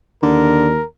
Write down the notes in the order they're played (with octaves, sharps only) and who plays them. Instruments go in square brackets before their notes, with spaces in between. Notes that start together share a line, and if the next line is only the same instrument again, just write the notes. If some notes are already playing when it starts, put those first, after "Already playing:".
[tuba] D#2 [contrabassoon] D3 [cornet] A#4